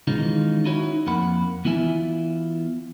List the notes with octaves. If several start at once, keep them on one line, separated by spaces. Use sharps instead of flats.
D#3 E3 G#3 C#4 D#4 F4
D#4 E4 F#4 C#5
F2 A#3 F#5 B5
E3 B3 E4 F4 E5 G#5